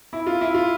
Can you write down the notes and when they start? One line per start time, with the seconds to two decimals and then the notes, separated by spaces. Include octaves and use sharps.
0.13 E4
0.27 F4
0.41 E4
0.55 F4